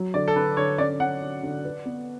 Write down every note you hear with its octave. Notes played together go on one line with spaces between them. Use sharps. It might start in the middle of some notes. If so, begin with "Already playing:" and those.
Already playing: F#3
D3 D5
A4
D3 B4
D3 C#5
C#4 D5
C#4 F#5
D3
D3
B4
B3